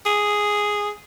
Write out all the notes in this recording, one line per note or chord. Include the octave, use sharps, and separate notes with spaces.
G#4